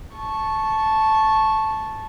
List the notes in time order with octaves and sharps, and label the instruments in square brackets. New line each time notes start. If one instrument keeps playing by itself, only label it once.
[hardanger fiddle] A5 C#6